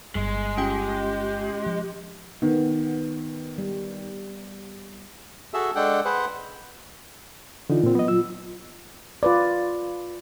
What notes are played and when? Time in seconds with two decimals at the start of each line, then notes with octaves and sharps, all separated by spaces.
0.15 G1 G2 G#3
0.58 C#4 F4 G4 G5
1.66 F3
2.42 D#3 B3
3.58 G3
5.54 F#4 G#4 A4 E5
5.76 G#3 D4 A4 F#5 G5
6.05 G#4 B4 C5 F#5
7.70 D3 E3 D#4 F4
7.83 A#2 C4
7.95 F#3 B3 D#5
8.08 F4 E6
9.23 F4 B4 D5